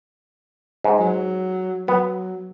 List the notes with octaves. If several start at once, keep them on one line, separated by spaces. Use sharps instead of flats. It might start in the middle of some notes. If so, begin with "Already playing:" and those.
G#2
F#3
F#3 B3